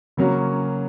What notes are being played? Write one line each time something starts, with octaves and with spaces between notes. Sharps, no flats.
C#3 F#3 A#3 C#4 F#4